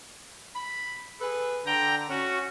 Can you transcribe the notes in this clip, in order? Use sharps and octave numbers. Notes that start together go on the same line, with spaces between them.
B5
G#4 A4 B4
D3 G5 A#5
C#4 F#4